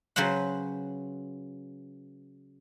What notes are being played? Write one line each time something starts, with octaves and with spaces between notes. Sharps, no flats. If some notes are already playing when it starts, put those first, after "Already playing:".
C#3 F#3 B4 C5 F#5